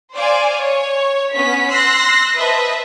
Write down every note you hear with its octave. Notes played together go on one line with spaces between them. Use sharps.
C5 D5 F5 G#5
C#5
B3 C#4 B6
C6 E6 F#6 A#6 C7
B4 C5 D#5 E5 A5